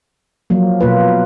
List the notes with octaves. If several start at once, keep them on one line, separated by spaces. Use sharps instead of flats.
F3 F#3 A#3
B2 A#3 F4 B4